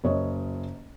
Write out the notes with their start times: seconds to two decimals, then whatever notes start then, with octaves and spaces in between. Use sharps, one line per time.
0.04 F#1 C#5 D#5